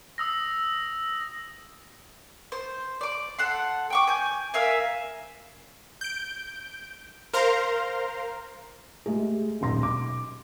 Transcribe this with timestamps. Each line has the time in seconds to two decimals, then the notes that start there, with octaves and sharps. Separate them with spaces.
0.18 D#6 E6 A#6
2.52 C5
3.01 D5 D6
3.39 A4 F#5 C6
3.90 G5 C#6 D6
4.08 G#5 G6
4.54 A#4 E5 F5 G#5
6.01 G6 D7
7.33 A#4 C5 F5 A#5 C6
9.06 G#3 A3 G4 G#4
9.61 D#1 B1 C6 A#6
9.83 D6